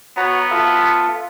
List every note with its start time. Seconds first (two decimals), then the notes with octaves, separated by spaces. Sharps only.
0.17 B3 F#4 C#5 A#5
0.51 F4 A4 E5